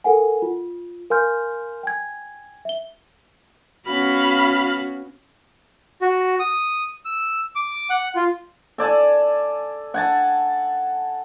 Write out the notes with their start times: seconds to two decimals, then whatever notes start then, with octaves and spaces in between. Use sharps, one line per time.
0.04 A4 A#4 F#5 G#5
0.42 F4
1.10 A#4 F5 G#5 C6 F6 G6
1.83 G5 G#5 G#6
2.65 E5 G7
3.87 B3 C#4 F#4 F5 B5
6.02 F#4
6.40 D#6
7.05 E6
7.55 D6
7.90 F#5
8.16 F4
8.78 A4 D5 G#5 A5
9.94 F#5 G#5 A5